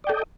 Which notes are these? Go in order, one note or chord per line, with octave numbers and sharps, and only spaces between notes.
A4 D5 D#5 G5